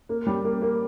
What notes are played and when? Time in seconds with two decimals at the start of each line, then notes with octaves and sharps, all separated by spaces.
0.09 A#3
0.27 G3
0.44 A#3
0.62 A#3